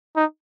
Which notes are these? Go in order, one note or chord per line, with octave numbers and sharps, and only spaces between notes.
D#4